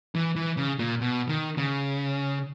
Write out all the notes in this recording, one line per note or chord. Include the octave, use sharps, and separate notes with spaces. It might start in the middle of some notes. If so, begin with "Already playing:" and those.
E3
E3
C#3
A#2
B2
D#3
C#3